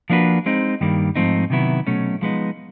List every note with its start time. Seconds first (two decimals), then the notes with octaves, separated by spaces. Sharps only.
0.10 F3 A#3 D4 F#4 B4
0.46 G#3 C4 D#4
0.81 G2 D#3 G3 A#3
1.15 G#2 F3 A3 C4 D#4
1.50 C3 D#3 F#3 B3 E4
1.87 B2 F#3 A3 C#4
2.21 F3 G#3 B3 D#4